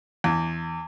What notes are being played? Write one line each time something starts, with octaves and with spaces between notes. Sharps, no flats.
E2